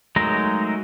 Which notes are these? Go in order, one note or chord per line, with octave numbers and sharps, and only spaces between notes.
F#3 G#3 A3 D#4 A#4